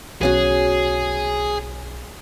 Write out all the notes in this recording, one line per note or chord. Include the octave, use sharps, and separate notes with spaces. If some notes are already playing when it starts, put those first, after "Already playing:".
B1 B3 C#4 F#4 G#4